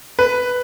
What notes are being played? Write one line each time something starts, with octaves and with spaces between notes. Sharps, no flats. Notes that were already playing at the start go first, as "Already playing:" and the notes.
B4